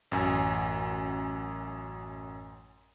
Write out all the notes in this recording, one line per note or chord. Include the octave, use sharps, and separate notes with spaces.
A1 F#2 G#5